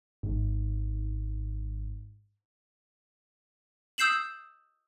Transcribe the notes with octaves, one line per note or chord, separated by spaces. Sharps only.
G#1 G#2
D#6 E6 G6 C7 E7 F#7